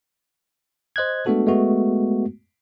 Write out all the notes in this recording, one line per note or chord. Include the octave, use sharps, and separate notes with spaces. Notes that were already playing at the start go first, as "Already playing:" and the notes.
C5 D#5 F#6 G#6
G#3 A3 B3 D4 F#4 A4
G#3 A3 B3 F#4